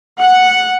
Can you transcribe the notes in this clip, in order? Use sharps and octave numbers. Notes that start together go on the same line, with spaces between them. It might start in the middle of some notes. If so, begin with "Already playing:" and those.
F#5